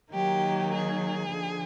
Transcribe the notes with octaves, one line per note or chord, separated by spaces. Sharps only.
D#3 F#3 A#3 D#4 G4
G#4
D3 F3